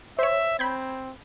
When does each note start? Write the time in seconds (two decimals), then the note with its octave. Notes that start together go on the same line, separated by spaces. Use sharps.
0.19 C5 C#5 E5
0.59 C4 B5 G6 G#6